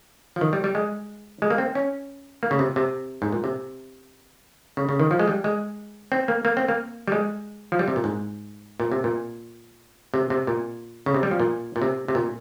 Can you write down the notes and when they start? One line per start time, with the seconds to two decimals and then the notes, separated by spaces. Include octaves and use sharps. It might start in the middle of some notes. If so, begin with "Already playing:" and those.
0.36 F3
0.41 D#3
0.53 G3
0.64 G3
0.75 G#3
1.42 G#3
1.50 A#3
1.58 C4
1.75 C#4
2.43 A#3
2.51 C#3
2.59 C3
2.76 C3
3.22 G#2
3.32 A#2
3.44 C3
4.77 C#3
4.89 C#3
5.00 D#3
5.11 F3
5.20 G#3
5.28 G3
5.44 G#3
6.12 C4
6.28 A#3
6.45 A#3
6.57 C4
6.68 A#3
7.08 G3
7.12 G#3
7.72 F3
7.79 G3
7.88 C3
7.96 A#2
8.04 G#2
8.80 A#2
8.92 C3
9.04 A#2
10.14 C3
10.30 C3
10.47 A#2
11.06 C#3
11.14 C3
11.23 G3
11.31 F3
11.40 A#2
11.76 A#2
11.82 C3
12.08 C3
12.15 A#2